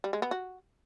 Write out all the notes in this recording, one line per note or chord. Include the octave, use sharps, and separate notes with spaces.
G3
G#3
B3
F#4